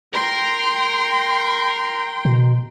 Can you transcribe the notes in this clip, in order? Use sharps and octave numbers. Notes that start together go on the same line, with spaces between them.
A#4 G5 C6
B2